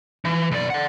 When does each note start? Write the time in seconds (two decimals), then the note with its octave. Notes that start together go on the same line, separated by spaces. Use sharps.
0.25 E3
0.52 B1 D5
0.70 D5 F#5